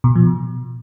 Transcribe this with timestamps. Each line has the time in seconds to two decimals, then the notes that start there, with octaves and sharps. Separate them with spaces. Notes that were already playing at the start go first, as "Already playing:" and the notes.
0.04 B2
0.15 F3
0.27 B2